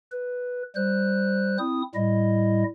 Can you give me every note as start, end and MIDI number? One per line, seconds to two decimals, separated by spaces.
0.12 0.63 71
0.76 1.58 55
0.76 1.58 72
0.76 1.58 90
1.58 1.82 60
1.58 1.82 64
1.58 1.82 87
1.95 2.64 45
1.95 2.64 55
1.95 2.64 64
1.95 2.64 75